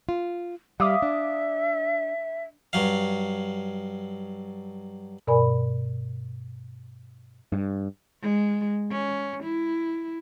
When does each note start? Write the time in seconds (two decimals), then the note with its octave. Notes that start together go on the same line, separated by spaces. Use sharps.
0.09 F4
0.80 G3 E5 F5 D6 D#6
1.02 D4
2.73 G2 F#3 F5
5.27 G2 B2 A#4 D5 G#5 B5
7.52 G2
8.22 G#3
8.91 C#4
9.43 E4